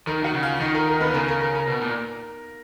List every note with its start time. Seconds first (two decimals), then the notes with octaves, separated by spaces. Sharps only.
0.07 D#3 A#4 A#5
0.23 D#3 F#4 F#5
0.34 C#3
0.43 F4 F5
0.60 D#3 D#4 D#5
0.75 A#4
0.88 A#4
1.01 B3 B4
1.10 D#3
1.14 C#3 A#4
1.28 A#4
1.40 A#4
1.55 A#4
1.67 B2
1.81 A#2